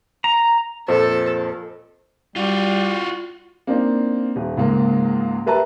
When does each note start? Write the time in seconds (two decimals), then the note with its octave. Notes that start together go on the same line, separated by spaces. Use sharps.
0.24 A#5
0.88 F2 A#2 A4 C5 D#5
2.36 G3 F4 F#4
3.67 A#3 C4 D4 D#4
4.36 D#1
4.57 C#2 G#2 A#3
5.46 G4 A#4 B4 E5 A5 A#5